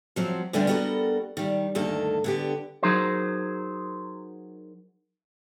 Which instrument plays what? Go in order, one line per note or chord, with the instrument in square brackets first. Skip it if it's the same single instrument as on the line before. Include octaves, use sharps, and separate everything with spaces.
[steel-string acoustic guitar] F3 F#3 C4
D2 D3 G3 B3 D4
G3 B3 F#4 G4 A4 A#4
D#3 G3
D2 G2 D#3 A#3 A4
D3 B3 G4
[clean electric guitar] F#3 D#4 G#4 A#4 C5